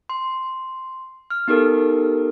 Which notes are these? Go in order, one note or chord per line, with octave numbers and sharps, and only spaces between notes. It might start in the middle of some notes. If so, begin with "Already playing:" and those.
C6
F6
B3 D#4 G4 A4 A#4